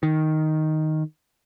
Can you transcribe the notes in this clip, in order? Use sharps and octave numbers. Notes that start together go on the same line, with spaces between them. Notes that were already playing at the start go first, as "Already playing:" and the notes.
D#3